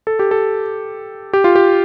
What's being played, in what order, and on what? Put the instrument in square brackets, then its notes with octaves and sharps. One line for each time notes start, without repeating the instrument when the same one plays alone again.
[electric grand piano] A4
G4
A4
G4
F4
G4